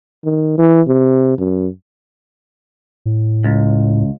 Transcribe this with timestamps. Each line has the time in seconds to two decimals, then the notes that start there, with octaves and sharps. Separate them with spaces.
0.24 D#3
0.58 E3
0.88 C3
1.38 F#2
3.06 A2
3.44 C#2